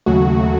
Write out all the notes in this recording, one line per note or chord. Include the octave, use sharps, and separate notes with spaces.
D#2 C#3 F#3 A3 F#4